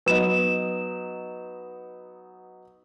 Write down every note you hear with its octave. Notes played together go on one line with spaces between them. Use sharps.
F#3 B3 D#4 B4 E7